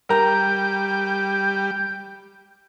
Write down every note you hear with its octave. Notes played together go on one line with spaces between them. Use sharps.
G3 A#4 A#5 G6